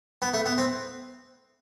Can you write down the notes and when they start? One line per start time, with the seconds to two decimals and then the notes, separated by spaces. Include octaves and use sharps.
0.22 B3
0.34 A3
0.46 B3
0.58 C4